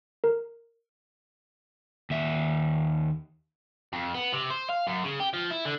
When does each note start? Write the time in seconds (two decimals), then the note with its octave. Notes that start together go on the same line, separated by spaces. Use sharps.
0.24 A#4
2.10 D#2 E5
3.93 F2
4.14 B3
4.33 C3
4.50 C5
4.70 F5
4.87 F#2
5.04 C#3
5.20 G4
5.33 F3
5.50 E4
5.65 D3